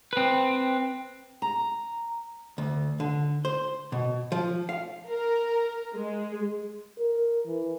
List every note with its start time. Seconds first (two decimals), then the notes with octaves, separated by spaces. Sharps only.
0.13 C4 B4
1.42 A#5
2.58 D2
3.00 D3
3.45 C5
3.92 B2
4.32 F3
4.69 F5
5.09 A#4
5.94 G#3
6.99 A#4
7.47 E3